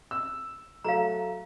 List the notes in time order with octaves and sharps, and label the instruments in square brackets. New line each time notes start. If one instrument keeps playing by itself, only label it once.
[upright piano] E6
[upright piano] F#3 A3 [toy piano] F5 A#5